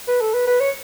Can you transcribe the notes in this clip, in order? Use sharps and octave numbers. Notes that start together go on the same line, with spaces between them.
B4
A4
B4
B4
C#5